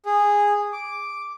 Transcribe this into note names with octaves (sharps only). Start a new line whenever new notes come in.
G#4
D6